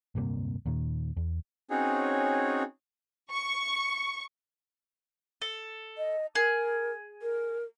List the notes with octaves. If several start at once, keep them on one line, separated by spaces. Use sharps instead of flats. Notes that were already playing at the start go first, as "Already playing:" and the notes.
D1 G2 C3 A#3
D#2 A#2 D#3
E2
C4 C#4 D#4 F#4 G#4 C#5
C#6
A4
D#5
G#4 A#4
A#4